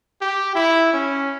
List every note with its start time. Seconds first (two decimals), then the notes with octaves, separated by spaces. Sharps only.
0.21 G4
0.55 E4
0.93 C#4